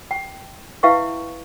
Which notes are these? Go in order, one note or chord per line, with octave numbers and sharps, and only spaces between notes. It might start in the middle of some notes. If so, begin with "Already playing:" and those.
G5
E4 B4 E5 F5 G5 C#6